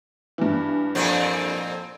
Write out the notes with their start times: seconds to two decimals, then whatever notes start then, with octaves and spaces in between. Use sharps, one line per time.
0.38 G2 E3
0.95 F2 A#2 C4